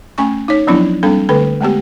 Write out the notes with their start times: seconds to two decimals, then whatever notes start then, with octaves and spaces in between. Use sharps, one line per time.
0.18 A3 C#4 G#5 C#6
0.48 D#4 C#5
0.67 F3 F#3 B3 C#4 D4 E4
1.03 G3 A#3 C4 D4 A4
1.29 D3 A3 A4 B4
1.61 G#3 A3 B3 G4